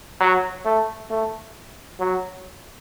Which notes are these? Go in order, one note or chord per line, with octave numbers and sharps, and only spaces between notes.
F#3
A3
A3
F#3